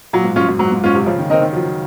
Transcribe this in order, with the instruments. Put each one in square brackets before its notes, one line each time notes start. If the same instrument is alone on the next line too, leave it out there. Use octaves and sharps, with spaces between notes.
[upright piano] A#2 [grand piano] F#3
[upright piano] G#2
[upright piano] F#2 [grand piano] C#4 F4
[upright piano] F#2
[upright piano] G#2 [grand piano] F#3
[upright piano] G#2
[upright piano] G#2 [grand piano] C#4 F4
[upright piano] C3
[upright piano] C#3 [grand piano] F3
[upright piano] D#3
[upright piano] D#3 [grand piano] C4 D#4 A#4 D#5
[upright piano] D#3
[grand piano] F3 [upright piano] F#3